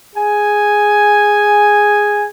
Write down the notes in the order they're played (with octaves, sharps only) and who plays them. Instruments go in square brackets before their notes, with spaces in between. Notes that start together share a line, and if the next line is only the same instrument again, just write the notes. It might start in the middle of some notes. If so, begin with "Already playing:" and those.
[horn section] G#4 G#5